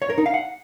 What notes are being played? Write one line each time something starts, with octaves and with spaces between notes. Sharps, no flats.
C#5
A#4
D#4
F5
F#5